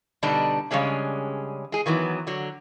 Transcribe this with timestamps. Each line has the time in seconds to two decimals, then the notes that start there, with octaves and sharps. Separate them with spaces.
0.23 B2 D3 G3 D4 D#4
0.71 C#3 G3 G#3 C#4 D4
1.72 G#3 G#4
1.86 D#3 E3 F#3 B3
2.27 D3 F#3